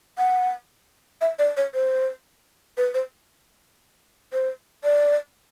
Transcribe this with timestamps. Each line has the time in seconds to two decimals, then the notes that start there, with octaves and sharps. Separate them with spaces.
0.18 F#5
1.21 E5
1.39 D5
1.57 C#5
1.74 C5
2.77 B4
2.94 C5
4.33 C5
4.84 D5